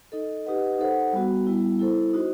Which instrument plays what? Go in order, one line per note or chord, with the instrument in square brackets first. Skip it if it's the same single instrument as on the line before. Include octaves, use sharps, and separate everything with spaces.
[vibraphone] D#4 A4 D#5
D#4 G4 B4 D#5 F#5
D#4 A4 C5 F#5
G3 B3 F#4
G3 B3 E4
E4 A4 C5
D#4 F#4 C5 D#5